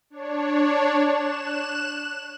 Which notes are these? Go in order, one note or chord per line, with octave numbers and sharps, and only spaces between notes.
D4 C#5
F#6 E7